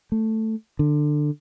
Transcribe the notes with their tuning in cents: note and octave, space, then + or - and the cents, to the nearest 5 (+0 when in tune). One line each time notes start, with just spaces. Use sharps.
A3 +5
D3 +20